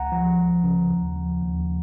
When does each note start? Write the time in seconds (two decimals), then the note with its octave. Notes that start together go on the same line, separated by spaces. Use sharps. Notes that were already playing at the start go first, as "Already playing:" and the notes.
Already playing: C#2 F#5 A#5
0.12 F3
0.38 C#2
0.64 C#3
0.90 D#2
1.16 F3
1.42 D#2